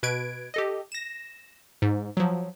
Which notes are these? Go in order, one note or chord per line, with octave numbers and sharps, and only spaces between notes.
B2 B4 G#6 D7
G4 A4 D#5
A#6 E7
G#2
F3 F#3